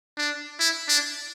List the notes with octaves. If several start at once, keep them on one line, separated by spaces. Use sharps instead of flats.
D4
E4
D4